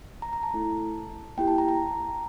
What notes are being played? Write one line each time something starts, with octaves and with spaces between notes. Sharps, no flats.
A#5
A#5
A5
A3 E4 A4 A5
A#3 E4 G4 G5
A5
A#5
A#5